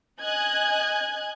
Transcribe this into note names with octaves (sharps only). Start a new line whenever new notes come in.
D#5 G#5 F#6 G#6